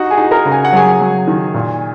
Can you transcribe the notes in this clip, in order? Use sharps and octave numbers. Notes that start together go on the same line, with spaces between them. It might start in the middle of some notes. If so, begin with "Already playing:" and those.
Already playing: D#4 F#4 F#5
G#4 G#5
D#4
A#4 A#5
C#3
G#5
F#5
F#3 G#4 G#5
F#3
D#3
A#2